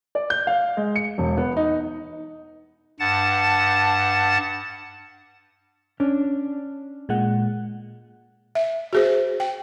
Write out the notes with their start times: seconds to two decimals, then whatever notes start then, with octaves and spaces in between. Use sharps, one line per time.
0.15 D5
0.30 G6
0.47 F5
0.77 G#3
0.96 C#7
1.18 E1
1.37 B3
1.57 D#4
3.00 G2 F#5 A5 A6
6.00 C#4 D4
7.09 A#2 G#3 F#5
8.55 E5
8.93 F#4 G#4 C5
9.40 G5